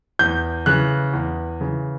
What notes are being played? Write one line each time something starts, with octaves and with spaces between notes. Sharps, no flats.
E2 G6
C#3 E3 F#6
E2
C#3 E3